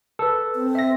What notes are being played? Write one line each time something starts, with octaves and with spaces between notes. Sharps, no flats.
A4 B4
C4
E5 A#6